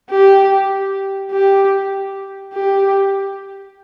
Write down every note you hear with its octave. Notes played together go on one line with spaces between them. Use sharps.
G4
G4
G4